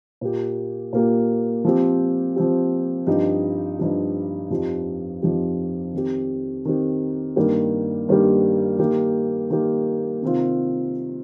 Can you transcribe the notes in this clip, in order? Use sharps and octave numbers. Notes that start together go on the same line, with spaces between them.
A#2 A#3 G4
A#2 A#3 G4
F3 C4 G4
F3 C4 G4
G2 F3 D#4 G4
G2 F3 D#4 G4
F2 F3 D#4 G4
F2 F3 D#4 G4
D#3 C4 G4
D#3 C4 G4
G2 D#3 G3 A#3 G4
G2 D#3 G3 A#3 G4
D#3 A#3 G4
D#3 A#3 G4
C3 D#3 C4 F4